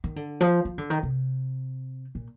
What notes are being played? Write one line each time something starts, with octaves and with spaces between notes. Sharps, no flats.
D#3
D3
F3
F3
D3
D#3
C3
A#2